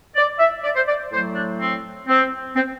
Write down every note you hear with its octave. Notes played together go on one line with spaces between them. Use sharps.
D5
E5
D5
C5
D5
A2 F#3 A3 C5
D4
C4
C4
C4